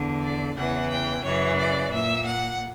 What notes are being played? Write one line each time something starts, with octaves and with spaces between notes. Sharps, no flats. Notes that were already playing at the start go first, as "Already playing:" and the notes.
Already playing: E2 D3
D5
E2 C#3 E3 F#5
G5
F#2 C#3 E3 C#5
D5
A#2 E5
F#5